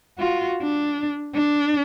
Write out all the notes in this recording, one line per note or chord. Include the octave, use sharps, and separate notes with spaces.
F4 F#4
D4
D4